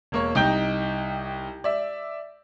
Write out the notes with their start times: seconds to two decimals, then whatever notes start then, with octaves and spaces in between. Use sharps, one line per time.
0.12 E1 A#3 C#5
0.35 C2 D#4 G5 G6
1.64 D5 E5